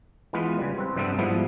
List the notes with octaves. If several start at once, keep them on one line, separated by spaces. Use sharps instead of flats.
E3 G#3 B3 F4 B4
C#3 G3
C4 B4
G2 C3 G3 B3 A4
G#2 F3 G3 B3 E4